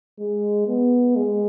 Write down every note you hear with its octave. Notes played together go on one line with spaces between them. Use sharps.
G#3
B3
G#3